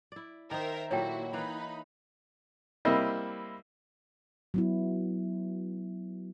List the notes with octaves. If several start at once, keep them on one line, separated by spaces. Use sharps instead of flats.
E4 D5
D#3 D#4 A#4 C5 E5
A#2 F#3 A#3 E4 F#4 A4 C#5 G5
E3 A#3 D#4 B4 B5
G3 A#3 C4 E4 D#5
F#3 B3 E4